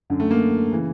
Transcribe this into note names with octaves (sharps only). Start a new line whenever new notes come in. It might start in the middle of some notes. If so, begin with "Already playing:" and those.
F#2 D3
A3
A#3
C#3 E3